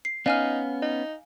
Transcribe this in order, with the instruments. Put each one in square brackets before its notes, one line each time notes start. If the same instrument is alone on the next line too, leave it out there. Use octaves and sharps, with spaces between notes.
[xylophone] C7
[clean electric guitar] B3 C#4 [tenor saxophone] D#4 [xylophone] F5 G#5 F6
[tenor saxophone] D#4